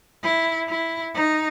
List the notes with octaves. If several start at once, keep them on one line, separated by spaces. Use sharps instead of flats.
E4
E4
D#4